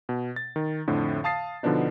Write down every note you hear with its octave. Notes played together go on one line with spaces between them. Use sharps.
B2
A6
D#3
F2 A2 D3
F5 A5 D#6 A6 C7
B2 D3 F3 B3 D4 D#4